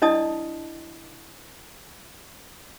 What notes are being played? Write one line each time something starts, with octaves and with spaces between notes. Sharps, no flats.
D4 E4 D5 D#5 A5 D#6